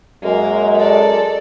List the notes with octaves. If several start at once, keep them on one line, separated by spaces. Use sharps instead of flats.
F#2 G#3 A#3
A4 D5